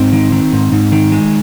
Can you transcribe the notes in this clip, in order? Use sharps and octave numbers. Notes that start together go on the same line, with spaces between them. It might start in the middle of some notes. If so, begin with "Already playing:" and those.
Already playing: G#2 C4
D#3
D#3
G#2
G#2
D#3
G#3